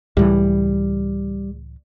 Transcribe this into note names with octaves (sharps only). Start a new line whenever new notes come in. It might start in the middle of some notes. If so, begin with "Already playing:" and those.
C#2 A2 E3 G3